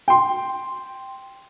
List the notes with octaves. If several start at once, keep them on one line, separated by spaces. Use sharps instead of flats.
G5 C6